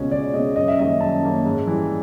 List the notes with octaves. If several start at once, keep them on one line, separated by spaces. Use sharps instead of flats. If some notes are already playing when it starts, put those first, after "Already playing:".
Already playing: C#2 B2 G#3 C#4
C#2 D5
B2 G#3 C#4 D#5
F#2 D#5
E5
D#3 G3 A#3 C#4 D#5
F#2 A5
D#3 G3 A#3 C#4
G#2
E3 G3